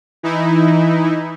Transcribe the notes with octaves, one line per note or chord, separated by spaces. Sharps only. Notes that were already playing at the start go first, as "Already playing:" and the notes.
E3 D#4 E4